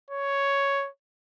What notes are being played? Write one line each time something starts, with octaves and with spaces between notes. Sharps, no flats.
C#5